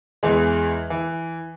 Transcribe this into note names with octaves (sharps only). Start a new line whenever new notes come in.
E2 E3 G#3
E3